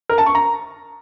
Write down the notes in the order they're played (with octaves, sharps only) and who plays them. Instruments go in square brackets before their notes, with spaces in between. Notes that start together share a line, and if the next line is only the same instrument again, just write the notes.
[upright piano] A#4
A5
C#6
A#5